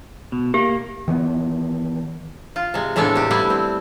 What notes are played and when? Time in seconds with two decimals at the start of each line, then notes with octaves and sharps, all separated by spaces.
0.32 B2
0.54 A#3 G4
1.08 D#3 E3 A3 B3
2.56 F4
2.74 C3 G#3
2.96 A2 G#3 A3 B3 D4 A4
3.15 C3 G4
3.31 G3 B3 E4
3.50 C4